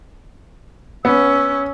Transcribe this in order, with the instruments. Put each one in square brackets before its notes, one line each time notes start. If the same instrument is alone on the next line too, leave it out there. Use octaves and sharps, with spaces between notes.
[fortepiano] B3 [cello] C#4 [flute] E6